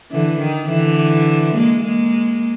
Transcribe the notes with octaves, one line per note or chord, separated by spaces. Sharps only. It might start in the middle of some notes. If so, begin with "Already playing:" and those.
D3 E3
D#3
D3 E3
G#3 A#3
G#3 A#3